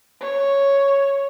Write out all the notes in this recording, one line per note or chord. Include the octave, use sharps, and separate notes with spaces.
C#5